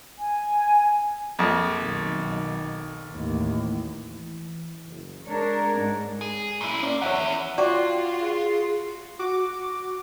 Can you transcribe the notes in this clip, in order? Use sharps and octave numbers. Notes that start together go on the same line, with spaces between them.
G#5
A#1 F2
B1 D#3
A1 D#2
E3
F#1
G#3 D4 A#4 C#5 D5
G#2
G#4
A#2 E4
A#3 C#4 D5
E2 C#5 E5 F#5
F4 F#4 D5 G5 C6 D6
G#4
F#4 D6